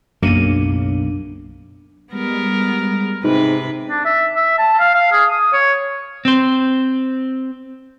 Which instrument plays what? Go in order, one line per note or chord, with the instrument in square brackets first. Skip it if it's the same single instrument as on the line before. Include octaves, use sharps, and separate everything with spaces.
[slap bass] B1 C#3 [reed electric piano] F#2 [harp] A#3 D#7 [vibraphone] D4
[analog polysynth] G3 G#3 [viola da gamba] B3 A#4
[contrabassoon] G#2 [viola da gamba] C3 B4
[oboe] D4
E5
E5
A5
F5
F5
G#4
D#6
C#5
[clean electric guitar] C4 C5